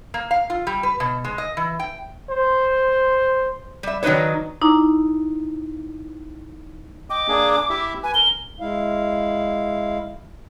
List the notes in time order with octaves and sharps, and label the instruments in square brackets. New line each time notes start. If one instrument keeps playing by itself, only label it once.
[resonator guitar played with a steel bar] A#3
F5
F4
G3
B4
B2
G#3
D#5
E3
G5
[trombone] C5
[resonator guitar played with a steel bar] G3 E5
D#3 F#3 D4 D#4 B4 C#5
[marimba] D#4 E4 A#5 D6
[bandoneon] D#5 G5 [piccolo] D6
[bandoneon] A#3 D4 G#4
E4 G4 E5
[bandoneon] B4 [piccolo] G#5
[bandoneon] A#4 [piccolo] G7
[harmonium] G#3 E4 F5